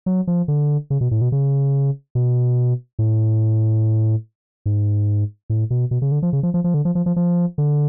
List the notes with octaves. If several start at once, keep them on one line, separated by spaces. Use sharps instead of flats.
F#3
F3
D3
C#3
B2
A2
B2
C#3
B2
A2
G#2
A2
B2
B2
C#3
D3
F3
C#3
F3
F3
F3
D3
F3
F3
F3
F3
D3